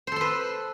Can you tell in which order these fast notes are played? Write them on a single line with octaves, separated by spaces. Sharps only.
C5 A4 C6 B4